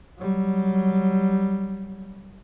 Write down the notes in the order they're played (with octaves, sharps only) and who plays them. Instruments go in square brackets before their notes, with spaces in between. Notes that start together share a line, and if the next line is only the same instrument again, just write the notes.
[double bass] F#3 G3